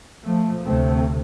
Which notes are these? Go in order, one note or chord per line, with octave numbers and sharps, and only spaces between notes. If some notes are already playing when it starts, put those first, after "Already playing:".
F3 A3
D2 C3 A3 C4